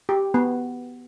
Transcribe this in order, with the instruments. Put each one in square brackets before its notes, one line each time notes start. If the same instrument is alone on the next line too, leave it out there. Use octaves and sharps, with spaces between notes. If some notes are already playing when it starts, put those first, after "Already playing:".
[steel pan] G4
B3